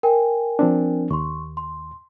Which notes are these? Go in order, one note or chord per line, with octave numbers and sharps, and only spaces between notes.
A#4 G5 G#5
F3 C4 D4
D#2 C6 C#6
C6